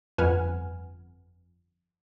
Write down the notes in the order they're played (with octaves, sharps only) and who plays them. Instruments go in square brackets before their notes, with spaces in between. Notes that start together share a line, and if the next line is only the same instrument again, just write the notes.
[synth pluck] G1 F2 B4 F#5 G#5 F6